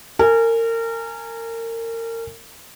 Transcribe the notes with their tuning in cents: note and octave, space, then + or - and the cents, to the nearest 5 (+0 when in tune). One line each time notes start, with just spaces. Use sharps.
A#4 -30 G#5 +0